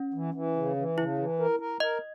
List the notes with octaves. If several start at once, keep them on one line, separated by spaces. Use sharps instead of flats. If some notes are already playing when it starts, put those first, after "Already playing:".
Already playing: C#4
E3
E3
C#3
E3
C#3 E4
E3
A#4
A#4
A#4 D#5